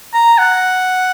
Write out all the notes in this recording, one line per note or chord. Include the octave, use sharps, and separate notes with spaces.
A#5
F#5